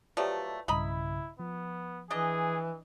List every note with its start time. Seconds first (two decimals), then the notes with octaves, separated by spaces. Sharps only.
0.17 F3 F#3 A3 G4 B4 D5
0.68 B1 G2 C#3 E4 D#5 A#5 B5
1.39 F3 B3
2.10 E3 D4 G#4 D#5